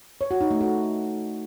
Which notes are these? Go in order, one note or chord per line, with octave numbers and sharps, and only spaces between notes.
C#5
F#4
D#4
A3
F#4